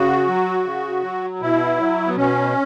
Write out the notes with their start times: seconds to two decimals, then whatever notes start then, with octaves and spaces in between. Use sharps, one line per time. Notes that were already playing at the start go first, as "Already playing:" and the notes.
Already playing: C#3 F#4
0.27 F#3
0.65 C#3
1.03 F#3
1.41 B2 E4
1.78 F#3
2.08 B3
2.16 B2 C#4